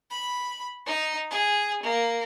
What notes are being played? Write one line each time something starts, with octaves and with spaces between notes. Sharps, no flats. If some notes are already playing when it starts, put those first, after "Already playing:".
B5
D#4
G#4
A#3